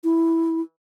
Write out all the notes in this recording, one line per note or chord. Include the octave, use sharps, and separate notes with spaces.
E4